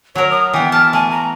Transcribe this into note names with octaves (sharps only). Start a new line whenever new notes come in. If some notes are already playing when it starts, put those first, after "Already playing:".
F#3 A#4 C#5
D#6
E3 B3 G5
A5 F6
A3 G#5
A#5